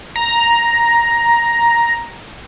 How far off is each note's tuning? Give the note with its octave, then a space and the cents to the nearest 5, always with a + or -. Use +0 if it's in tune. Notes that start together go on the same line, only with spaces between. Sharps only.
A#5 +5